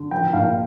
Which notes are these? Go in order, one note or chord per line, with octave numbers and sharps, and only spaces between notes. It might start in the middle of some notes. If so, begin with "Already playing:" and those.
Already playing: D3
F3 G5
A#1 F5